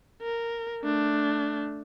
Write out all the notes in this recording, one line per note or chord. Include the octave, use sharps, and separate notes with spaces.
A#4
A3 D4